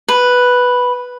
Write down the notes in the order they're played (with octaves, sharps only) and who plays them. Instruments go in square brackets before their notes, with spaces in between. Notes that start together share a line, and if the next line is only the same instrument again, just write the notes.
[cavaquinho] B4